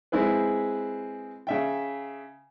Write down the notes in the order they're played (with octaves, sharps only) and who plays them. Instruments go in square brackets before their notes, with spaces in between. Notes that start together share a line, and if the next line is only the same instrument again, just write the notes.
[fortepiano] G#3 C4 E4 G#4 B4
C#3 E5 G5